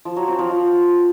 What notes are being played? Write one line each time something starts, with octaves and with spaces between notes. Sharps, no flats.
F3
F#3
C4
F3
F4